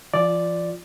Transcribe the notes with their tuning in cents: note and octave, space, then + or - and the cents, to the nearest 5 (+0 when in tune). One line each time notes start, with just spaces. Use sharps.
F3 -45 F4 +0 D5 +0